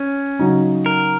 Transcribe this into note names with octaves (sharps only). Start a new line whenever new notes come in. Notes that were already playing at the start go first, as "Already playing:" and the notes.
Already playing: C#4
C#3 F#3 D#4
A#4